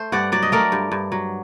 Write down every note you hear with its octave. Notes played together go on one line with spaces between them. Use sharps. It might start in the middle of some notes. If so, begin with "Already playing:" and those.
Already playing: A3 C5
G2 D5 F#5
F#3 D5
D#5
A3 A#4 D5
G2
G2
F#3